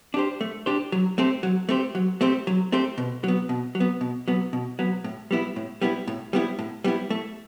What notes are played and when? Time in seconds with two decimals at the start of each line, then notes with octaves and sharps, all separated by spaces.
0.14 D4 G4 C5
0.41 A3
0.66 D4 G4 C5
0.92 F#3
1.18 A3 C4 G4 C5
1.43 F#3
1.69 A3 C4 G4 C5
1.95 F#3
2.21 A3 C4 G4 C5
2.47 F#3
2.72 A3 C4 G4 C5
2.98 B2
3.24 F#3 B3
3.49 B2
3.75 F#3
3.80 B3
4.01 B2
4.28 F#3 B3
4.53 B2
4.79 F#3 B3
5.04 A2
5.31 G3 B3 E4
5.56 A2
5.81 G3 B3 E4
6.07 A2
6.33 G3 B3 E4
6.59 A2
6.84 G3 B3 E4
7.10 A3